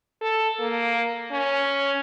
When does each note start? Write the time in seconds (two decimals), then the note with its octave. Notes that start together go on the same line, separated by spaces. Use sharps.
0.22 A4
0.60 A#3
1.31 C#4